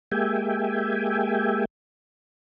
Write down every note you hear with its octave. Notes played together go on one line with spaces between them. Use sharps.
G#3 A#3 G4 E5 G5 G#5